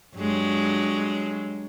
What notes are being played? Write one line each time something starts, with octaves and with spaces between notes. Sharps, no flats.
G2 F#3 G#3